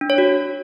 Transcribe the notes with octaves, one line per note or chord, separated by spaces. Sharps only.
D4
C#5
F#4